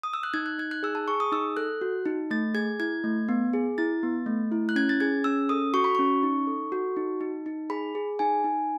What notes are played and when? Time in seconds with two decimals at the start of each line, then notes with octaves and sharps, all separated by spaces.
0.03 D#6
0.14 E6
0.23 F#6
0.34 D#4 G#6
0.46 F#6
0.58 D#4 G#6
0.71 F#6
0.83 G#4 E6
0.95 A5
1.08 G#4 C#6
1.20 D#6
1.32 D#4 E6
1.57 A4 F#6
1.81 F#4
2.06 D#4
2.31 A3 A6
2.54 G#4 G#6
2.80 E4 G#6
3.04 A3
3.29 B3
3.53 G#4
3.78 E4 A6
4.03 B3
4.26 A3
4.52 E4
4.69 F#6
4.76 C#4 G#6
4.89 A6
5.00 G#4 G#6
5.24 C#4 E6
5.49 A4 D#6
5.74 F#4 C#6
5.84 B5
5.95 C#4 C#6
6.23 D#4
6.47 A4
6.72 F#4
6.97 D#4
7.21 D#4
7.46 D#4
7.70 G#4 B5
7.95 G#4
8.19 D#4 G#5
8.44 D#4